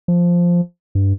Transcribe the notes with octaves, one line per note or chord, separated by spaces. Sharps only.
F3
G2